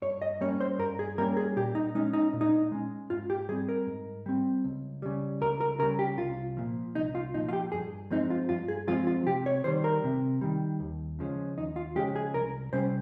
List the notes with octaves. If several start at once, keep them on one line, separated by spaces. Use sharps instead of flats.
G2 C#5
D#5
G3 A#3 C#4 C#5
C5
G2 A#4
G#4
G3 A#3 C#4 A#4
G#4
A#2 G4
D#4
G#3 C#4 D#4
D#4
A#2
D#4
G#3 C#4
G#2 F4
G4
G3 C4 G#4
A#4
G#2
G3 C4
C#2
C#3 G3
C#2 A#4
A#4
C#3 G3 A#4
G4
C2 F4
A#2 F3
C2 D#4
F4
A#2 F3 D#4
F4
G4
G2 G#4
F3 G#3 C4 D#4
F4
G2 F4
G#4
F3 G#3 C4 F4
F4
C3 G4
C#5
D#3 G3 C5
A#4
C3
D#3 G3
D#2
C#3 F3 G#3 C#4
D#2 D#4
F4
C#3 F3 G#3 C#4 G4
G#4
C2 A#4
C3 G3 C#4 C5